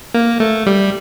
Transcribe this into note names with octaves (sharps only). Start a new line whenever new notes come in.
A#3
A3
G3